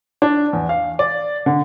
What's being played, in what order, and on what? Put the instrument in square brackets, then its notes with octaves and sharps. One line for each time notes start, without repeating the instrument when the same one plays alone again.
[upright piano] D4
E2
F5
D5
D3